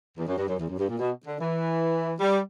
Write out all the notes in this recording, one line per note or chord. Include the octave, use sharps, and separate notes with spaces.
E2
F#2
G2
F#2
E2
F#2
G2
A#2
B2
D3
E3
G3